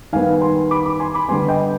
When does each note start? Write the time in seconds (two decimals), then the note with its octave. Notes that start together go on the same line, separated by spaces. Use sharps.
0.12 D#3 G3 B3 F5 G#5
0.41 G#5 C6
0.71 B5 D6
0.85 B5 D6
1.00 G#5 C6
1.14 B5 D6
1.29 D3 G3 B3 G#5 C6
1.48 D#5 G5